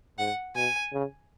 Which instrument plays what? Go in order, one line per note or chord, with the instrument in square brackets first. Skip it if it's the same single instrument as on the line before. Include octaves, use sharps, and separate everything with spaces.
[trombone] G#2 [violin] F#5
[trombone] B2 [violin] G#5
[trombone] C#3